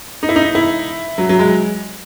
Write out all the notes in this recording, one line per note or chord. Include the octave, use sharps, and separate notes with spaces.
D#4
E4
D#4
E4
F#3
F#3
G#3